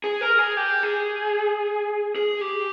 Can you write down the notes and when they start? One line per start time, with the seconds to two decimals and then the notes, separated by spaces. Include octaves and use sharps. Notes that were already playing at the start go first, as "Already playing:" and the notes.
0.04 G#4
0.21 A#4
0.39 G#4
0.57 G4
0.83 G#4
2.16 G#4
2.41 G4